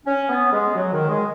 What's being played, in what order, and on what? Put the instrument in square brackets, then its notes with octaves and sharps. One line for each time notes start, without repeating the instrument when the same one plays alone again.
[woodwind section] C#4
B3
G#3
F#3
D#3
G#3